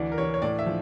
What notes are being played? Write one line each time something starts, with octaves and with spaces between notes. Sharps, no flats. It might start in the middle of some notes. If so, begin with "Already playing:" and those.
Already playing: D2 E3 D5
A#4
E3 C#5
C#5
A2 D5
E5
F3